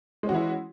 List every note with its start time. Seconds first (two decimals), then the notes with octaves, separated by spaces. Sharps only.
0.23 G#3
0.26 C#4
0.29 F#4
0.32 E3
0.35 E4